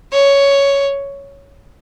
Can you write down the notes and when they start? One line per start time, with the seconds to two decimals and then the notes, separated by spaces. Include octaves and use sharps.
0.13 C#5